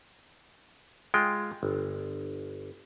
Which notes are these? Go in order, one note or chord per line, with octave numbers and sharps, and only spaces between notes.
G#3 F4 G5
G1